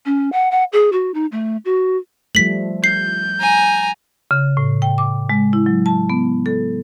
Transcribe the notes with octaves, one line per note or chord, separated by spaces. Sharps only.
C#4
F#5
F#5
G#4
F#4
D#4
A3
F#4
F3 G3 A3 B6 F#7
G6 C7
G#5 A#5
C#3
A2
G5
D6
G#3
E4
F#3
A5
B3
A4